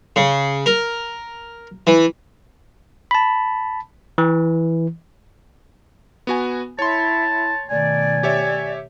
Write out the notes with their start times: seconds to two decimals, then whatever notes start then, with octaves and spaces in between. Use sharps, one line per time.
0.16 C#3
0.66 A#4
1.87 E3
3.11 A5 B5
4.18 E3
6.27 B3 F#4 G#5
6.79 E4 C#5 A5 C6
7.70 B2 D#3 A3 D5 G#5
8.23 G4 C#5 E5